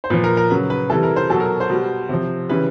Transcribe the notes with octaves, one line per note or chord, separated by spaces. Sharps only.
C5
A#2 F3 B4
A#4
A#4
C#3 F#3 B4
B4
C3 E3 G3 A4
A#4
C5
B2 F#3 A4
A#4
C5
B2 G3
C3 F3
C#3 E3 G3 B4